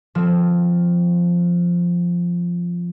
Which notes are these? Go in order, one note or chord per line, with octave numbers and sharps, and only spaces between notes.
F3 C4